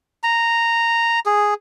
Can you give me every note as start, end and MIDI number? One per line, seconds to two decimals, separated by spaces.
0.23 1.20 82
1.26 1.54 68